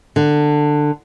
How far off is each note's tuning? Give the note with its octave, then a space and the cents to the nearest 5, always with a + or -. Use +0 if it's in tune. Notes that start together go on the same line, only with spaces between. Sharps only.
D3 +15